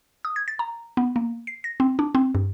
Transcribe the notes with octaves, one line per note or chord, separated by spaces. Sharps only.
D#6
G#6
A6
A#5
B3
A#3
C7
A#6
C4
D4
C4
G2